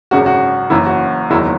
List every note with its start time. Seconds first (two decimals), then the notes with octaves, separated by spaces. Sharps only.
0.11 G#1 F#2 C#3 G#3 F#4
0.26 F#4
0.70 F#1 F#2 E3 E4
0.86 F#4
1.30 F#1 E2 D#3 F#3 E4